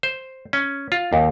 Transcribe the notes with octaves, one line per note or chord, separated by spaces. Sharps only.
C5
C#4
F4
D#2